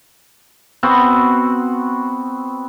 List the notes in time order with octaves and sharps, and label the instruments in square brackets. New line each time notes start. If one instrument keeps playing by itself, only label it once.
[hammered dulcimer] B3 C4 F#4 F#5